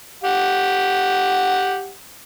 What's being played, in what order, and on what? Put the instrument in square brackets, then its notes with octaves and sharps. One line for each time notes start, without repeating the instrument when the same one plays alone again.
[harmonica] G4 F#5